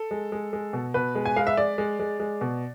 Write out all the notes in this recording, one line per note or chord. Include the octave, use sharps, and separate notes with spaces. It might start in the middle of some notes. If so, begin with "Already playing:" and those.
Already playing: A4
G#3
G#3
G#3
B2
B2 B4
G#3
G#5
G#3 F5
E5
G#3 D5
G#3
G#3
G#3
B2